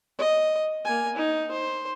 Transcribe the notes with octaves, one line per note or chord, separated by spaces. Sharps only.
D#5
A#3 G#5
D#4
C5